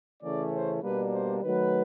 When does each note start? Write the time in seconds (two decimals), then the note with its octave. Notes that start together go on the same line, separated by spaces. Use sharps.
0.23 C#3 E3 A3 C#4 D5
0.53 C5
0.83 B2 G3 A#3 D4 B4
1.13 C5
1.43 D#3 F#3 A3 B4